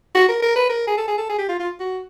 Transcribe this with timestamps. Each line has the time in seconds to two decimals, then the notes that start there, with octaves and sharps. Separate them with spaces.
0.15 F#4
0.29 A#4
0.42 A#4
0.56 B4
0.69 A#4
0.87 G#4
0.97 A4
1.08 G#4
1.18 A4
1.29 G#4
1.38 G4
1.49 F4
1.59 F4
1.80 F#4